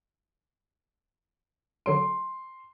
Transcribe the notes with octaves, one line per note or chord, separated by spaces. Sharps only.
D3 F#3 C6 D7